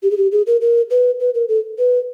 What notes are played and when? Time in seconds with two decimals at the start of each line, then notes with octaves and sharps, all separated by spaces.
0.03 G4
0.11 G#4
0.17 G4
0.32 G#4
0.47 A#4
0.61 A#4
0.90 B4
1.20 B4
1.34 A#4
1.49 A4
1.78 B4